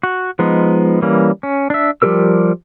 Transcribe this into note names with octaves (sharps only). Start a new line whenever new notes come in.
F#4
F3 G#3 B3 D#4
E3 G3 A#3 C#4
C#4
D4 E5
F3 G3 G4 A#4 E6